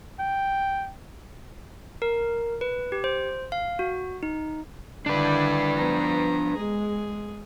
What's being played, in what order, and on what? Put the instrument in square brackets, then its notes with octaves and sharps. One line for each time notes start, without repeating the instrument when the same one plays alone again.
[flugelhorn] G5
[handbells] A#4
B4
G4
C5
F5
F#4
D#4
[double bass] D3 D#3 [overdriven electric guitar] D4 B4 [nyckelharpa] E4 D5
[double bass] F3 [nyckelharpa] B3 A#5
[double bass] G#3 [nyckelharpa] G#4